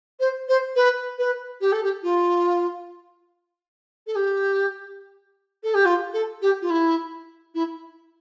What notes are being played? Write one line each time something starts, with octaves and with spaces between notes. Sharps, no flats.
C5
C5
B4
B4
G4
A4
G4
F4
A4
G4
A4
G4
F4
A4
G4
F4
E4
E4